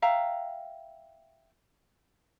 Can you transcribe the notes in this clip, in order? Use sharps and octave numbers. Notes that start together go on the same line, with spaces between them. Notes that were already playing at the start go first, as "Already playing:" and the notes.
E5 F5 G5 A#5